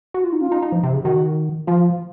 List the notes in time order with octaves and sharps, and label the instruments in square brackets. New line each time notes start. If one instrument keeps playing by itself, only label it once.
[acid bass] F#4
F4
D#4
[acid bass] C#4 [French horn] F4
[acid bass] D#4
D#4
F3
C3
C#3
[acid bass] D#3 [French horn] F#4
[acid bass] F3 [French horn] F4